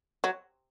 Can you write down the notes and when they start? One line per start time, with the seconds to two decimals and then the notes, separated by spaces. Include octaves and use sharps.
0.24 F#3